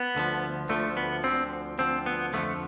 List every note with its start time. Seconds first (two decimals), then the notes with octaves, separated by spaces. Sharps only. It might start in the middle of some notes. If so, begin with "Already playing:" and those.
Already playing: B3
0.15 D2 D3 F3
0.69 D2 D3 F3 A3
0.97 B3
1.24 D2 D3 F3 C4
1.78 D2 D3 F3 C4
2.06 B3
2.33 F2 D3 F3 A3